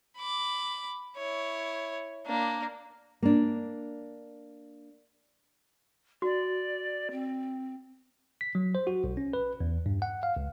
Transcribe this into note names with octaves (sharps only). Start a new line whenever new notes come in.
B5 D6
E4 C#5
A#3 D4
A#3 D4
F#4 D5
C4
B6
F#3
C5
F#4
B1
C#4
B4
E2
G2
F#5
F5
C#2